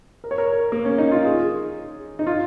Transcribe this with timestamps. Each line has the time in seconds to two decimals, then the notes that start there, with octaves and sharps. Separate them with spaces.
0.24 A#4
0.31 C#5
0.38 A#4
0.72 A#3
0.85 C#4
0.98 D#4
1.11 F4
1.25 G#4
2.19 D#4
2.26 F4